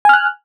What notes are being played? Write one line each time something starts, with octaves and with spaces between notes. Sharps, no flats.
G#5 F6 F#6